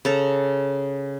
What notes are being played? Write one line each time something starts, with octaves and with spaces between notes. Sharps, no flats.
C#3 A4 A#5